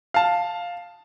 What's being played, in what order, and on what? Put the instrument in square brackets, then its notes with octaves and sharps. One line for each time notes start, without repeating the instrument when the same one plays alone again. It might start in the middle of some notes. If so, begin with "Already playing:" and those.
[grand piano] F5 A5